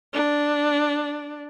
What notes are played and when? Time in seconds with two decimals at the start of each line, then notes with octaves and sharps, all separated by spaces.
0.14 D4